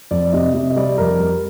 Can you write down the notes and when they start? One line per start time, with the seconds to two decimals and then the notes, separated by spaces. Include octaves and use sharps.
0.11 F2 D5
0.33 C3 D#5
0.54 C3 D#5
0.70 D#5
0.76 G3 D5
0.98 F2 A#4
1.19 G3